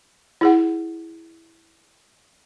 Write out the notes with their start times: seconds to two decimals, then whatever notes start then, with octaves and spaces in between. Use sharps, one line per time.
0.41 E4 G#4 F#5